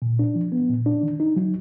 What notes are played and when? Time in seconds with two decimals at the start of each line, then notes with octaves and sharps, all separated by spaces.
0.02 A#2
0.19 D4
0.35 F3
0.52 B3
0.70 A#2
0.86 D4
1.03 D#3
1.20 D#4
1.36 F#3